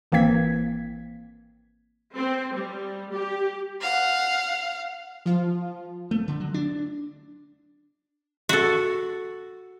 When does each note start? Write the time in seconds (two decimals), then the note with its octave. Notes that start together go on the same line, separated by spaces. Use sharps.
0.12 G#1 E3 A#3 C4 G#6 B6
2.15 C4
2.54 G3
3.12 G4
3.81 F5 F#5
5.26 F3 F4
6.11 A3
6.28 D3
6.40 F#3
6.54 D4
8.49 F#4 A4